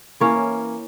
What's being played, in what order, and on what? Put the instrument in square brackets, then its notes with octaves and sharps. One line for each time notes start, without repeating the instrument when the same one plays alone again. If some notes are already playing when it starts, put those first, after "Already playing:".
[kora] E3 A#3 C#4 C#5